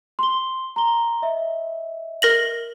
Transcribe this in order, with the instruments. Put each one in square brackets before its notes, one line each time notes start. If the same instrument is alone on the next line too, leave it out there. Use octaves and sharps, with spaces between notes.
[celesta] C6 G7
A#5 C6 G7
D#5 E5
[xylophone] A#4 A#6 F#7